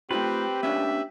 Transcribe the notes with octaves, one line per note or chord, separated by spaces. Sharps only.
A3 C4 D#4 F4 G4 B4
A#3 C#4 D4 E5